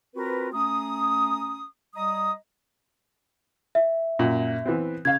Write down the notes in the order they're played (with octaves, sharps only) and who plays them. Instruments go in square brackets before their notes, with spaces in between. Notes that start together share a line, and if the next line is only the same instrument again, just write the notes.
[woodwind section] C4 F4 F#4 A#4 B4
A3 C#4 A#5 D#6
G3 D#5 A#5 D#6
[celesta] E5
[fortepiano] F#2 A#2
E3 B3 C4
[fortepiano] C#3 F5 [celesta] G#6